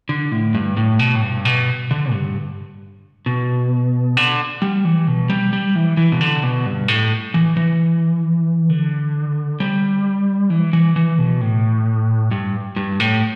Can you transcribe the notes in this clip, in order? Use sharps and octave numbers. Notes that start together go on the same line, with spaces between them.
D3
A2
G2
A2
B2
A2
G2
B2
D3
G2
B2
D3
G3
E3
B2
G3
G3
E3
E3
B2
D3
B2
G2
A2
E3
E3
D3
G3
E3
E3
E3
B2
A2
G2
G2
A2